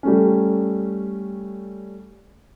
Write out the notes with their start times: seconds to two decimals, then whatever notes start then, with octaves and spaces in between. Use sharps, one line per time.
0.03 G3 A3 C#4